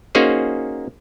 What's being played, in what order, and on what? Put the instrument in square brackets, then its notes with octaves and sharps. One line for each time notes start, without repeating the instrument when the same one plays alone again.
[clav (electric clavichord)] A#3 C#4 D#4 F#4 G#4 C5